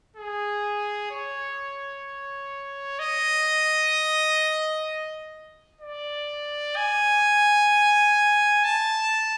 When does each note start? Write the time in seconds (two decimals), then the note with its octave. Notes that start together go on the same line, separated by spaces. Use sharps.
0.17 G#4
1.11 C#5
2.99 D#5
5.82 D5
6.76 G#5
8.64 A5